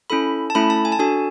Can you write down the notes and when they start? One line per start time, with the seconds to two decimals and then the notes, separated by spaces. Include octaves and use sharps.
0.10 C#4 E4 A4 B5
0.50 A5
0.55 A3 C#4 E4 A4 B5
0.70 A5
0.85 G#5
0.92 A5
0.99 D4 F#4 A4 G#5